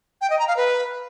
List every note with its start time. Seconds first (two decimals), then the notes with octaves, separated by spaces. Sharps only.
0.21 G5
0.30 D#5
0.39 A#5
0.48 F5
0.57 B4